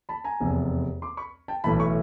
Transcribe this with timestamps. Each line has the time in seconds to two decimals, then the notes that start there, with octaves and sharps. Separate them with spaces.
0.09 A5 B5
0.24 G#5 A#5
0.40 F1 E2 C3
1.02 C6 D6
1.17 B5 C#6
1.48 G5 A5
1.64 B1 A2 E3 A5 B5
1.80 B5 C#6